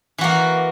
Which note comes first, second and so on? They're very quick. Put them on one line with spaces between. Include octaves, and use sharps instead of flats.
E3 F#4 A#3